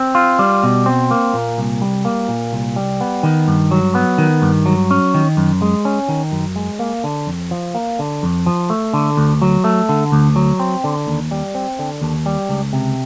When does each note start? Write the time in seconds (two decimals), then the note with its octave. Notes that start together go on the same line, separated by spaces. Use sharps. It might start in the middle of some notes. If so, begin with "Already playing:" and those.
Already playing: C4
0.15 F4
0.39 G3
0.63 B2
0.86 C4
1.11 A#3
1.34 A#2
1.58 C2
1.81 G3
2.05 A#3
2.28 A#2
2.53 C2
2.76 G3
3.01 B3
3.23 D#3
3.48 G2
3.71 F#3
3.95 B3
4.18 D#3
4.42 G2
4.66 F#3
4.91 C#4
5.14 D#3
5.37 F#2
5.62 G#3
5.85 C#4
6.09 D#3
6.32 F#2
6.56 G#3
6.79 A#3
7.04 D3
7.27 F2
7.51 F3
7.75 A#3
7.99 D3
8.23 F2
8.46 F3
8.70 A3
8.94 D3
9.17 D2
9.42 F#3
9.64 A3
9.89 D3
10.12 D2
10.36 F#3
10.59 C4
10.84 D3
11.07 D#2
11.31 G3
11.55 C4
11.79 D3
12.02 D#2
12.26 G3
12.49 C#2
12.73 C3